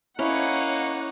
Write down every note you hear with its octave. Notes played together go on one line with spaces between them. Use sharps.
A#3 C#4 D#4 E4 C#5 F#5